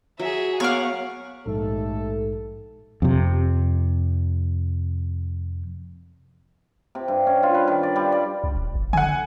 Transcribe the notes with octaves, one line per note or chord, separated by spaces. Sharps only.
F#3 G#4 E5
A#3 B3 C#5 F5 F#5 G#5 D6
A#1 D#2 G#2 A3 A4
F2 C3
C3
G2
C#4
F4
B4
D#3
D5
G3
D5
C#2
D#1
G1
D3 F#5 G#5